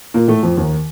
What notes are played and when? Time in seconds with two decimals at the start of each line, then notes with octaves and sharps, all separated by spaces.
0.14 A#2 A#3
0.28 A2 A3
0.43 F2 F3
0.57 D#2 D#3